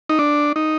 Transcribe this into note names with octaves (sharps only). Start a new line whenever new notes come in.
D#4
D4
D#4